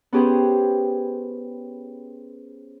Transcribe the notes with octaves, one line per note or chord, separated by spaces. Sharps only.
B3 C#4 G4 G#4 B4 C5